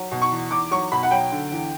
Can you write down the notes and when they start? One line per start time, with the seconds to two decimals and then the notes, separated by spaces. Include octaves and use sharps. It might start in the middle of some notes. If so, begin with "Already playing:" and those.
Already playing: F#3
0.11 B2
0.22 C#6
0.32 E2
0.51 E2 D6
0.71 F#3 C#6
0.92 B2 B5
1.03 F#5
1.11 F#3 G5
1.32 D3
1.52 E2